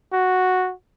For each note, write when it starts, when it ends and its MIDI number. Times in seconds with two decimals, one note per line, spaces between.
0.13 0.73 66